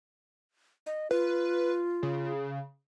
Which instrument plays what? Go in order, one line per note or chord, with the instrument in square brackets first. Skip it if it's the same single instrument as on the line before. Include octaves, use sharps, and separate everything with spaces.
[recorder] D#5
[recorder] F4 [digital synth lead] B4
[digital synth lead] C#3